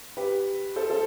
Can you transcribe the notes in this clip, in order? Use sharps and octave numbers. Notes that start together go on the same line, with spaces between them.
G4 B4
A4 C5
A4 C5